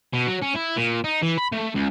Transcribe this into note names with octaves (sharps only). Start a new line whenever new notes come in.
B2
F#3
C#4
E4
A#2
D#4
E3
B5
A3
C#2